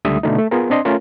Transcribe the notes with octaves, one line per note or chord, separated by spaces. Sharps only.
C#2 D3 G3 A3 E5 D#6
B2 D3 A3 D#4
A3
B3 F4 G#4 A#4
C4 D4 D#5 C6
A3 C#4 F4 A#4